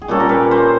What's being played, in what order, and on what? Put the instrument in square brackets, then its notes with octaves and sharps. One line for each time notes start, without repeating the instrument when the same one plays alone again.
[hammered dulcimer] G#4
A#2 G3 A#3 C#4 A4
A#4
B4
C5